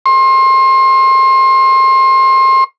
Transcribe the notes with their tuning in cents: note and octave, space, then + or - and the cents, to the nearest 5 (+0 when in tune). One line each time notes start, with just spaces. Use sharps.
C6 +30